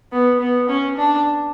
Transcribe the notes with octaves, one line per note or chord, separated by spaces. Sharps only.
B3
B3
C#4
D4